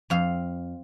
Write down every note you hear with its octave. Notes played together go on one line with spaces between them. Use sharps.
F2 F5